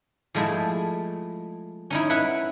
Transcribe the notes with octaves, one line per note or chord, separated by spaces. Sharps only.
F3 G#3 A3 E4
C#4 D#4 E4
E4 B4 F#5